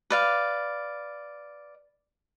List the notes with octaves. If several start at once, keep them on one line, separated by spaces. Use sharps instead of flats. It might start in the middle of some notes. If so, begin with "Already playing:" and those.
B4 D5 F5